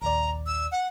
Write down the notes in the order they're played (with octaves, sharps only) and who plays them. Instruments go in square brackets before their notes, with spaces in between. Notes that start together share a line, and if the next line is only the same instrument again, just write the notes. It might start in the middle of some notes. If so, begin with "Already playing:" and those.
[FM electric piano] A#1 D#2 D5 [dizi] A#5
[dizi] E6
F#5